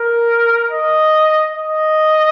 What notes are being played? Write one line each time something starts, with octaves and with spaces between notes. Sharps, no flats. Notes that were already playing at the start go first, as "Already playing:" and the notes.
Already playing: A#4
D#5
D#5